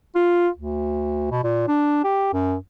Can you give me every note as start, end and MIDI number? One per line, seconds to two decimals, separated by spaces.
0.16 0.48 65
0.57 1.31 38
1.31 1.42 47
1.44 1.66 46
1.68 2.03 62
2.04 2.32 67
2.33 2.55 42